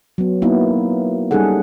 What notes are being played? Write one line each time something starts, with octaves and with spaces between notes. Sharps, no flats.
F#3 B3
A#3 B3 D#4 E4
G3 C#4 D#4 G#4 A4 F#5